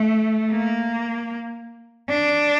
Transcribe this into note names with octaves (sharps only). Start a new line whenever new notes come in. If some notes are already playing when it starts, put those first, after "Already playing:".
Already playing: A3
A#3
D4